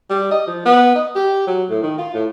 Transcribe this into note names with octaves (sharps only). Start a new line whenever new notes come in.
G3
D#5
F3
B3
D#5
G4
F#3
A2
D#3
F4
A2